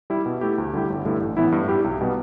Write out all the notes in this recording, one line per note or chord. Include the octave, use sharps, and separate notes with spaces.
G3 E4
B2
A3 E4 G4
D2
D3 G3 E4 G4
G1
G2 D3 A3 E4
A1
A2 E3 B3 E4
G2
G3 E4 G4
B1
B2 G3 B3